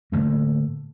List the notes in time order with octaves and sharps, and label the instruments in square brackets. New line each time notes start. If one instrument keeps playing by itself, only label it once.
[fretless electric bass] A2 D3 A3 A#3